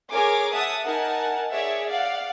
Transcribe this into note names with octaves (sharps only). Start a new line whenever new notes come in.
G#4 A#4 C#5 G#5 D6
E5 F#5 A5 D#6
D#4 A#4 F#5 G#5 A5
G#4 C#5 D5 E5
D5 F5 F#5